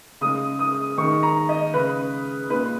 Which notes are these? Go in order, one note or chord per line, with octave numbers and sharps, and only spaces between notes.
C#3 G#3 D#6
D#6
D#3 G#3 C#6
A#5
D#5
C#3 G#3 B4
A#2 G#3 B4